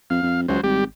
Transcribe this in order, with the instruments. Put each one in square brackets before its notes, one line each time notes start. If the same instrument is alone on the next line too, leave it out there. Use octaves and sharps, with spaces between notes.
[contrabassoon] F2 [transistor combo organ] F5
[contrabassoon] F2
[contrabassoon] C#2 [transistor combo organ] F#3 C5
[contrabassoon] G#1 [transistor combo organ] G3 G4